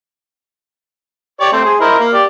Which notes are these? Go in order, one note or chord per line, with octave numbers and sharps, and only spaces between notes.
G4 C#5 D5
A3 C4 C5
G#4
E4 A#4 C5 D#5
A#3
G4 D5